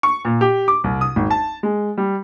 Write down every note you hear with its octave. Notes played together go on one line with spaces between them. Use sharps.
C#6
A#2
G4
D6
C2
D#6
G#1
A5
G#3
G3